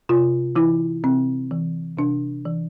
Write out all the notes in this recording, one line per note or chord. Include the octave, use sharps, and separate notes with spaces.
C3 F4
E3 E4
C3 C4
E3
C3 D4
E3